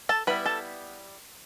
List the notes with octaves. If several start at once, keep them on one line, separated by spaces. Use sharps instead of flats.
A4 A5
G3 B3 E4 B4 B5
A4 A5